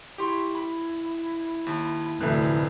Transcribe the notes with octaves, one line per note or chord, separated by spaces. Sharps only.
E4 G4 C6 C#6
B5
D#2
F1 D2 A2 E5 F#6